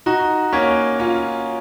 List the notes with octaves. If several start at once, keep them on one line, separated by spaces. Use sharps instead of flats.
D#4 F#4 A#5
A#3 C#4 C#6 G#6 B6
C#4 F4 A#5